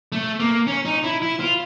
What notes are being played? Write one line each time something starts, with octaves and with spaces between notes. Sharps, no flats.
A3
A#3
C#4
D#4
E4
E4
F4